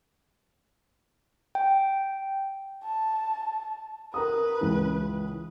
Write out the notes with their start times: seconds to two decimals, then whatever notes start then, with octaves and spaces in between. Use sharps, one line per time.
1.55 G5
2.83 A5
4.14 A#4 B4 A#5 D#6
4.61 C#2 E3